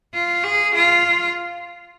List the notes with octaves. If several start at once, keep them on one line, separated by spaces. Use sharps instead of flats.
F4
G#4
F4